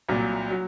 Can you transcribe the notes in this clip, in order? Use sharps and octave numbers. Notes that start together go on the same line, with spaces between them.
C2 A#2 F#3
F#3